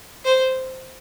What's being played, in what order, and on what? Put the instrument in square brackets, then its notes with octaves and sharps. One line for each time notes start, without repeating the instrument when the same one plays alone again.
[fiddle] C5